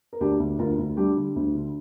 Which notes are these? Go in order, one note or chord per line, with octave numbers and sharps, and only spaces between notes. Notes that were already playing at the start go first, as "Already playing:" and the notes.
A#4
D2 D4 G4
D2
D2 F4 A#4
D2
G3 D4 G4
D3
D2
D3